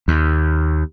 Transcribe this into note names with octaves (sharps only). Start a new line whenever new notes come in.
D#2